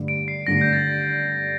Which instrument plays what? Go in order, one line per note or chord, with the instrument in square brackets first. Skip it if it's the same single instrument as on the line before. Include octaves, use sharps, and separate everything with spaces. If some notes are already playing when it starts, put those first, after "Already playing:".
Already playing: [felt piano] G2 D3 A3 D4
[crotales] D7
C7
[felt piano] G2 D3 A3 D4 [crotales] A#6
[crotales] G6
A6